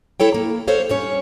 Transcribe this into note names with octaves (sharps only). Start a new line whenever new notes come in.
E4 A4 C#5 G5
A#3
F#3 A#3 A4 C5 C#5 F5
G3 C#4 C#5